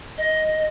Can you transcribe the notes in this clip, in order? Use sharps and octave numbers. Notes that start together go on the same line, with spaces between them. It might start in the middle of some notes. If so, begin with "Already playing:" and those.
D#5